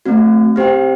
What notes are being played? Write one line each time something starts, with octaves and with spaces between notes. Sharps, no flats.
A3 C4 F#4
C4 G4 C5 G5